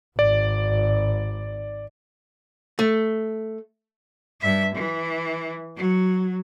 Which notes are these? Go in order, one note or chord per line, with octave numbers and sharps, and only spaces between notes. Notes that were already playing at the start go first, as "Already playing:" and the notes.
G#1 D5
A3
G2 E5
E3
F#3